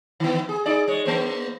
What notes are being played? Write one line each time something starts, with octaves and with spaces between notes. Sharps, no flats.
D#3 B3
G#4
D#4 G#4 D5
G#3 C#5
A#3 B3 C5